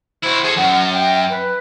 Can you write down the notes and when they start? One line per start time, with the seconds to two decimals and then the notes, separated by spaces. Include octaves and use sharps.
0.23 E4 F#4 C5
0.45 G#4 A4
0.57 F#2 F#5
0.93 G5
1.30 B4